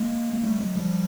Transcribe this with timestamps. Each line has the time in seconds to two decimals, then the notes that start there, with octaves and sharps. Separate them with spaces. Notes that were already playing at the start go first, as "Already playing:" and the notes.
Already playing: G#3 A#3
0.34 A#3
0.44 G3 A3
0.60 F#3 G#3
0.77 F3 G3